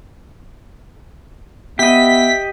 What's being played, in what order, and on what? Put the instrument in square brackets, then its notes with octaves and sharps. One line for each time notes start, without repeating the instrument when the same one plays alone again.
[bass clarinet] B3 [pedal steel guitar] G4 D#5 [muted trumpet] E5 [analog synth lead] B6